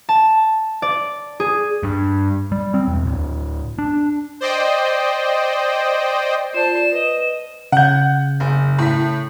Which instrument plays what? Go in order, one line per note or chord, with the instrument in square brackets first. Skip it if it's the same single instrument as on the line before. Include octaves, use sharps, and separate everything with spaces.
[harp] A5
D5
G#4
[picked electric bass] G2
G3
C4
E1
D1
D4
[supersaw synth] C5 D5 D#5 G5
[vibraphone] F4 D5 [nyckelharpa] C5 A5 [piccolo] E7
[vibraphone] B4 [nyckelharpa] D#5
[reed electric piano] C#3 G6 [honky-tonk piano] F#5
[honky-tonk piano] F#1
A2 B6